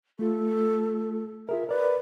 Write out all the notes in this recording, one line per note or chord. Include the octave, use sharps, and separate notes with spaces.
A3 F4 A4
F4 G#4 A#4 E5
A#4 B4 D5